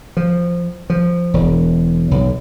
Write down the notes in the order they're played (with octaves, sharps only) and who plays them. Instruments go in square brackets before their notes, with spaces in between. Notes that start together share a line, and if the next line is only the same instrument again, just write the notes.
[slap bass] F3
F3
E1
B1